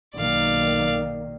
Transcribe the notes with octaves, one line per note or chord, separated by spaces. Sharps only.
B1 D#3 A#3 D5 F5